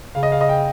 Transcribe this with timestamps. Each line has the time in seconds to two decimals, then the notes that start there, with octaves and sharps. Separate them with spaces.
0.15 C#3 F5
0.23 D#5
0.32 F5
0.41 D#5
0.49 G5